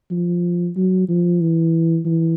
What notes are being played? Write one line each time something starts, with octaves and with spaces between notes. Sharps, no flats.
F3
F#3
F3
E3
E3